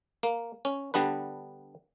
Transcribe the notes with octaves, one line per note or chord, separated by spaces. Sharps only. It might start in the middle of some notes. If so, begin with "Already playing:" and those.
A#3
C#4
D3 G3 B3 D4 B4